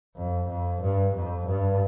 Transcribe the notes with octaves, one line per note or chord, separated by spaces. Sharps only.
F2
F2
G2
F2
G2